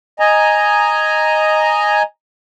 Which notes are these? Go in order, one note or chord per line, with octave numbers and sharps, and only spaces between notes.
D#5 G#5 A#5